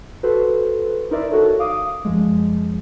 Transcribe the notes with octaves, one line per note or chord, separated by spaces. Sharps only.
F#4 A4 B4 C5
D#4 E4 A#4 C5 D5 E5
D#4 F#4 A4 C#5
F5 D6 D#6
F#2 F3 G#3